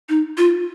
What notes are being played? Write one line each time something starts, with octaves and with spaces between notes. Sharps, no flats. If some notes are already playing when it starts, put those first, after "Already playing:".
D#4
F4